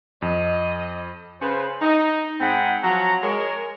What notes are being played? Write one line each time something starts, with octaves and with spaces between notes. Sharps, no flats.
F2 D#5
C#3 B4 C5
D#4
G#2 C4 G#4 F#5 G#5 B5
F3 F#3 F#4 C#5 F#5 A#5
G#3 A#4 C#5